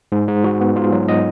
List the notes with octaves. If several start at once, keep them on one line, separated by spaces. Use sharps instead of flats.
G#2
G#2
G#2 F#4
B3
G#2 F4
F#3
D#5